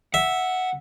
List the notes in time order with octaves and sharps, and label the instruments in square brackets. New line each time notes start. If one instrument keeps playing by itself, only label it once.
[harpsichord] E5 [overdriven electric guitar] F#5